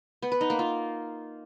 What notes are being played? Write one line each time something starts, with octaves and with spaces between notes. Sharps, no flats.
B3
B4
D#4
A#3
F4